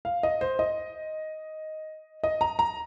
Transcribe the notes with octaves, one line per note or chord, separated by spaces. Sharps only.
F5
D#5
C5
D#5
D#5
A#5
A#5